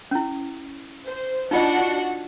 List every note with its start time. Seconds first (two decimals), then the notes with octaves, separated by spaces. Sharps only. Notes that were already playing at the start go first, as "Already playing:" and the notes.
0.11 C#4 E4
1.07 C5
1.51 D4 D#4 F4 F#4 D#5 F#5